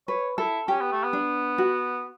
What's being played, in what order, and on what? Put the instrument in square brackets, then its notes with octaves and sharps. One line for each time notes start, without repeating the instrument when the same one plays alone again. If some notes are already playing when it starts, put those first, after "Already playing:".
[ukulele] B4 [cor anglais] C#5
[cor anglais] E4 [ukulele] A4
[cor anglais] C#4 [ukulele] G4
[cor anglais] B3
A3
B3
[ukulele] D4
F#4